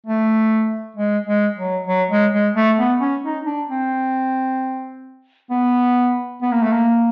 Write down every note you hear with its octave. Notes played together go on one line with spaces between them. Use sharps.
A3
G#3
G#3
F#3
F#3
G#3
G#3
A3
B3
C#4
D#4
D4
C4
B3
B3
A#3
A3
A#3